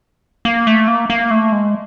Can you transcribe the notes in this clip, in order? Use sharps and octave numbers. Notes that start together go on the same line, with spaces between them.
A#3
A3
A#3
A#3
A3
G#3